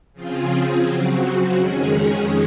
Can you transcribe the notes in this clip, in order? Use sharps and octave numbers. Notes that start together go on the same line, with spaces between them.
C#3 F3 C4 F4 G#4
C#3 F#3 C4 F#4
F2 D#3 G#3 C#4 G#4